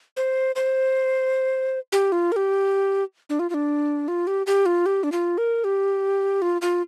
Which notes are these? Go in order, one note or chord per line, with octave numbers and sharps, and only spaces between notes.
C5
C5
G4
F4
A#4
G4
D4
F4
F4
D4
F4
G4
G4
F4
G4
D4
F4
A#4
G4
F4
F4